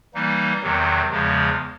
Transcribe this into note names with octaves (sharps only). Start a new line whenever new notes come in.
E3 G3 A#3 D#4
E2 C3 D#3 F#3
E2 C#3 F3 G#3